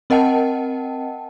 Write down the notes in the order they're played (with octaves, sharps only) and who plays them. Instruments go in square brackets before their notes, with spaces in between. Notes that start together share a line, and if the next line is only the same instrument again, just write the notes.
[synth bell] C4 A#4 D#5 F#5 G5 A5